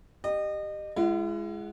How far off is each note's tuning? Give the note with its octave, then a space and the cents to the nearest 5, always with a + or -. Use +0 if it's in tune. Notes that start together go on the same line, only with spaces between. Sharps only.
G4 +0 D#5 -30
G#3 +0 E4 +45 F#5 +0